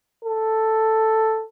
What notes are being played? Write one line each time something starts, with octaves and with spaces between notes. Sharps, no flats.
A4